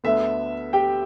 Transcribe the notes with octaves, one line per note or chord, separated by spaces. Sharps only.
D2 D3 B3 E5
G4 G5